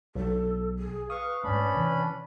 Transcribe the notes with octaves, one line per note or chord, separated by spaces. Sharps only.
B1 A4
G#4
B4 F5 C#6 D#6
G#2 A3 C#4 D4 B5
C3 E3